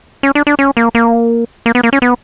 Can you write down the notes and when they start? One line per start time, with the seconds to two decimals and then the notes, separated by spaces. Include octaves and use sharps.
0.23 C#4
0.35 D4
0.47 D4
0.59 C#4
0.77 A#3
0.95 A#3
1.66 A#3
1.75 B3
1.83 A#3
1.93 C#4
2.02 B3